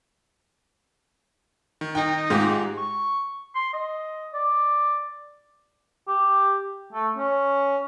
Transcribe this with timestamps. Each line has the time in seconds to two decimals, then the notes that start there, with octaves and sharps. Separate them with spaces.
1.81 D#3
1.95 D#4 G5
2.30 G#2 G#3 F4 G4
2.78 C#6
3.55 C6
3.74 D#5
4.34 D5
6.07 G4
6.93 A3
7.17 C#4